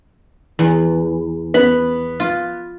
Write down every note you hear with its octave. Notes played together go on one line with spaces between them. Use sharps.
E2
B3 B5
F4